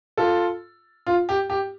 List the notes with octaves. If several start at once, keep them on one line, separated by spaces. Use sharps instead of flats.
F4 A4
F4
G4
G4